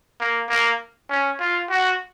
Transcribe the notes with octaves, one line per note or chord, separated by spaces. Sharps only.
A#3
A#3
C#4
F4
F#4